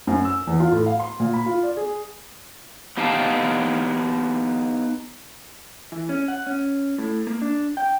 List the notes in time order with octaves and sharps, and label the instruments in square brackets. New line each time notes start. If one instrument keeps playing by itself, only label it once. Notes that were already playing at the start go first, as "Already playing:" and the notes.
[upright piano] F#2
E6
E2
F4
A2
F5
C6
A#2
B5
F4
D5
G#4
[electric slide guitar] B3 D#4 G4 F5 G5 A5
[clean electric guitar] E3
C#4
F#5
C#4
A2
A#3
D4
G5